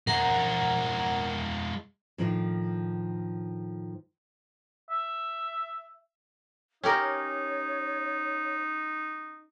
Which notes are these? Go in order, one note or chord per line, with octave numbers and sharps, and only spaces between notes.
G#3 E4 A#4 F#5 A#5
A2 D#3 F3 D4
E5
C#4 D#4 G4 A#4 C#5